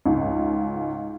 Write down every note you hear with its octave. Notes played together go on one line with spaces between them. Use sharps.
C#2 G#2